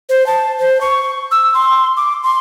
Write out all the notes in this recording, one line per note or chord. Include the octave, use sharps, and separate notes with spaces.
C5
A5
C5
C#6
E6
C6
D6
C6